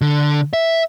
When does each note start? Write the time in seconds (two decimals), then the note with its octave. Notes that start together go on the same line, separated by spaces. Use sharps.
0.01 D3
0.53 E5